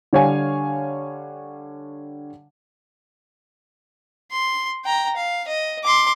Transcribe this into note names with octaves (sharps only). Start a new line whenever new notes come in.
D3 G3 C#5 F5 G#5
C6
G5 A#5
F5
D#5
C6 D6